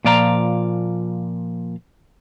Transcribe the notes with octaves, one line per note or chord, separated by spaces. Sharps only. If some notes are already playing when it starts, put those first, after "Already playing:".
A#2 F3 D5 F5 A#5